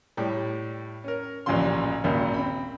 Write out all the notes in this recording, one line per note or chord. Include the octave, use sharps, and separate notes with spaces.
A2 G3
C#4 A#4
A1 D2 A#2 C#3 F3 C6
G#1 D#2 A#2 C#3
C4 B5